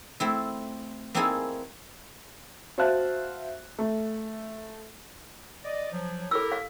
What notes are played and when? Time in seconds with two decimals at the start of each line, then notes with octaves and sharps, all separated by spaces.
0.20 A3 C4 E4
1.14 A#3 C4 D#4 E4 G#4 A4
2.78 F#4 C5 E5 F5 A5 F#6
3.79 A3
5.65 D5 D#5
5.92 F3 F#3
6.31 E4 G4 A4 A#4 E6
6.52 F5